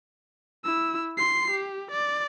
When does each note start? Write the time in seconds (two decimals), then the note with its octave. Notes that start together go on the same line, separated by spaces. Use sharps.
0.64 E4 E6
1.17 C6 C7
1.50 G4
1.91 D5